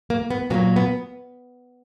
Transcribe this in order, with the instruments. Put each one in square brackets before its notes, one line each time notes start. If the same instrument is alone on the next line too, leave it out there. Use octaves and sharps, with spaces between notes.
[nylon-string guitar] A#3
B3
A#2 F#3 A#3 B3
B3